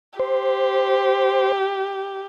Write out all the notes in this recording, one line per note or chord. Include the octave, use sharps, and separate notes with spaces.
G4 C5